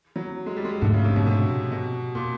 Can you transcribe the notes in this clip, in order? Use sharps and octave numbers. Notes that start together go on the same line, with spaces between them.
F#3
G#3
G3
G#3
G#2 D3 F3 A3 D4
C#3
C3
B2
C3
B2
A#2